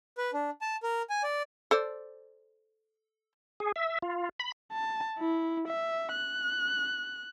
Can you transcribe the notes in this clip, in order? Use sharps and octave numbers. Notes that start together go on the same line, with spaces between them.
B4
D4
A5
A#4
G#5
D5
A4 C5 D5
G#4
E5
F4
B5
A5
E4
E5
F#6